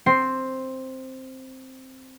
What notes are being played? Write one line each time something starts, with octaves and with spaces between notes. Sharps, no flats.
C4 C7